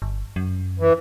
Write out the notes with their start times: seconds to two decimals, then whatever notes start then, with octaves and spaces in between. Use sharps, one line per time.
0.02 G1
0.36 F#2
0.80 E3